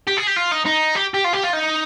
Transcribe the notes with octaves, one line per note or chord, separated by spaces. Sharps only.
G4
G#4
G4
F4
D#4
D#4
G4
G4
F4
G4
F4
D#4